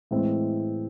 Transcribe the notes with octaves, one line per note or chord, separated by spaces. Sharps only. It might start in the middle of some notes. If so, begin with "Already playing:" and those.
A2 E3 G#3 C4